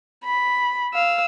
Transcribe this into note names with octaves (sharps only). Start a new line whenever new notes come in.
B5
F5 E6